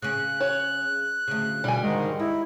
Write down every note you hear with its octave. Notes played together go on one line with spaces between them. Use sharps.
C#3 C#4 F#6
C#5
D2 C#3
B2 G3 G#5
G#2 D#3 G#3
D#4 E4